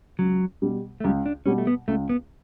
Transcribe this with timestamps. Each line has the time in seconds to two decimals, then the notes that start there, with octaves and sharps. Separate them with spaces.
0.19 C#2 F#3
0.62 B2 G3
1.00 A3
1.04 C#2 G3
1.26 D4
1.46 B2 G3 C#4
1.58 A3
1.67 B3
1.88 C#2 A3
2.09 B3